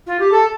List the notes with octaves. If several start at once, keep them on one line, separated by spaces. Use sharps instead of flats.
F4
G4
A4